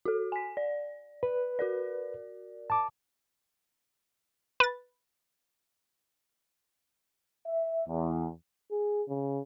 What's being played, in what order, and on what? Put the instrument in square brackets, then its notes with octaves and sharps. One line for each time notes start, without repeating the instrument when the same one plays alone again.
[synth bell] F#4 A4
G#5 B6
D5
[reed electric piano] B4
[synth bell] F#4 A#4 D5
[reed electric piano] A5 D6
[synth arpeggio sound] B4 A6
[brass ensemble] E5
E2
[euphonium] G#4
C#3